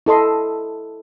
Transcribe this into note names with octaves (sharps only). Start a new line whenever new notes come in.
E4 A4 D#5 C6